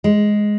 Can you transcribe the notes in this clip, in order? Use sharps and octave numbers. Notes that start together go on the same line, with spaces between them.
G#3